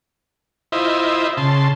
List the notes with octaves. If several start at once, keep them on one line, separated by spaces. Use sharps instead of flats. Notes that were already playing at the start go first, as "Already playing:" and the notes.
E4 F4 C5 D#5 E5
C#3 A5 C6